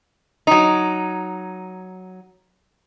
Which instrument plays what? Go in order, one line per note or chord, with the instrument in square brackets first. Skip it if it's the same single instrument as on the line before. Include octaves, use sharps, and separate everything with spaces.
[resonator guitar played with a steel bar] F#3 D#4